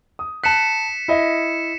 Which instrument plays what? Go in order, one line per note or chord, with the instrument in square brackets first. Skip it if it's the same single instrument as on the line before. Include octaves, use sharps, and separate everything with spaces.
[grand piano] D#6
[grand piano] A5 F#6 [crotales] B6 C#7 E7
[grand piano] E4 D#5 E5